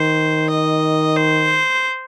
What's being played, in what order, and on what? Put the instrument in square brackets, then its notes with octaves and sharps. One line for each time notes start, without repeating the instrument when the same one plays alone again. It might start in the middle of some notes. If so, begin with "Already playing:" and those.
Already playing: [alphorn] D#3 [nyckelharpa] C5
[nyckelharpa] D#5
C5